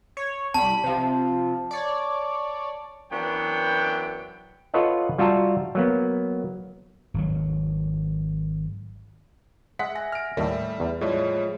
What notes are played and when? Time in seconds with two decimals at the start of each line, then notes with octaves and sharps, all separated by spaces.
0.17 C#5
0.54 C2 G3 A5 B5
0.84 C3 F3
1.71 C#5 D5
3.11 F#2 E3 B3 D4 G5
4.74 F4 A4 B4 C#5 D#5 F#5
5.18 G3 F4 F#4 E5 A5 A#5
5.75 F#3 A#3 B3
7.14 G#1 F#3
9.79 G#3 E5 F#5 B6
9.95 G#5 A#6
10.12 F6 D7
10.37 D#2 A2 G3 A4 E5
10.80 E2
11.01 A2 F3 G3 G#3 C#5